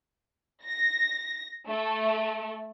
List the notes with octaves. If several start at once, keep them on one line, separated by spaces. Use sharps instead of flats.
A#6
A3